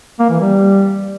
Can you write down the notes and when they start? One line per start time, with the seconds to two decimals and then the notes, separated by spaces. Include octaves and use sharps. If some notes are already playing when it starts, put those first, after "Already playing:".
0.19 A#3
0.30 E3
0.40 G3